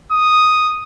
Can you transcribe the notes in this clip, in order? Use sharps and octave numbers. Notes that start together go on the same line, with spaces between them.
D#6